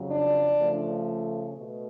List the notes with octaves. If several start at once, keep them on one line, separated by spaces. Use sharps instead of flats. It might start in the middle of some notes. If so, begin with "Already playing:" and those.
Already playing: F2 C#3 F#3
D4
C#3 F3 A3
B2 A3